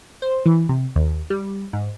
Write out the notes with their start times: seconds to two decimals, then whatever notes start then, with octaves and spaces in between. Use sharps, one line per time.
0.22 C5
0.46 E3
0.69 C3
0.96 D#2
1.30 G3
1.73 G#2